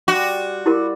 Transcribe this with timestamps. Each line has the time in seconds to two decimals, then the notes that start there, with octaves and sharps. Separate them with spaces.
0.08 G3 F4 F#4
0.66 E4 G4 A#4 D5 B5